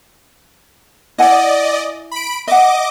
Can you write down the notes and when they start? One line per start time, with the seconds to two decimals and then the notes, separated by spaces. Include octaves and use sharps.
1.18 E4 D5 D#5 F#5 G#5
2.11 B5 D7
2.47 D#5 E5 F#5 D6